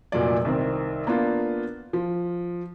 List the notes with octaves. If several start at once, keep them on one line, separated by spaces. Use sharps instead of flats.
F1 A#2 F#3 D5
C2 D#3 C4
A#3 B3 D4 F4
F3